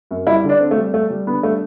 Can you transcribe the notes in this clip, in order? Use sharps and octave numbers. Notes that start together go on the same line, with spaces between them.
F#2
G3 E4
D3
D4
C4
A3
G3
G3 A3
G3
D3 B3
G3 A3